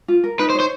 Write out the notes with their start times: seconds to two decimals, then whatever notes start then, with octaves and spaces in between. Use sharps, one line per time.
0.08 F4
0.24 A#4
0.39 D#4 B4
0.50 C5
0.55 C#5
0.60 C5